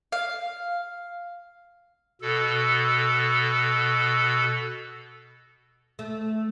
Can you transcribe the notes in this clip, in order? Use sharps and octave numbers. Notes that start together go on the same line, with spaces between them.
F5
B2 A4
A3